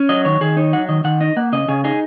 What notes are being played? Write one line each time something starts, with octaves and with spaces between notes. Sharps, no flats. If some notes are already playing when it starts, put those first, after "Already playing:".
Already playing: C#4
F#3 D#5
D#3 C#5
D#3 G#4
D#4 C#5
F#3 F#5
D#3 D#5
D#3 F#5
D#4 D#5
A#3 F#5
C#3 D#5
C#3 G#4
D#4 G#4